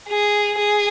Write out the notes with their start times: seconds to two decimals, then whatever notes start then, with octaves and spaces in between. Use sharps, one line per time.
0.08 G#4
0.58 G#4